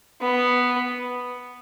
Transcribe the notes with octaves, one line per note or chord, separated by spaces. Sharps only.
B3